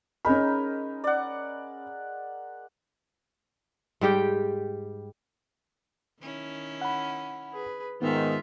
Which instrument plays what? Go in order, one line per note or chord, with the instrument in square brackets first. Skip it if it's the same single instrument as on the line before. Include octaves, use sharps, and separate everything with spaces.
[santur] G#3 D#4 A#4 [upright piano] C#4 B5
[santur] D5 F#5
[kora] G#2 G3 G4 G5
[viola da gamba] D#3 C#4 E4
[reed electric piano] F#5 B5
[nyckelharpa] G#4 B4
[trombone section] G#2 D#3 [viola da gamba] G#3 D#4 [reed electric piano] B3 [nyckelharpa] F4 E5